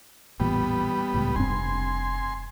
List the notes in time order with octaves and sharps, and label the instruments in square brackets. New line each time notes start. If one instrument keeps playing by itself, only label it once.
[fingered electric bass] A1 E2 A#2 [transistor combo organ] G3 B3
[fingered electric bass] C#2 A2
[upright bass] F1 C3 [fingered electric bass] G2 C4 [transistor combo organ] G#5 C6